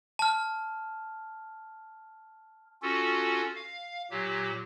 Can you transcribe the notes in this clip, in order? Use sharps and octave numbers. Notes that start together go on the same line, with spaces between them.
A5 F6
C#4 F4 F#4 A4
F5
A#2 F#3 G4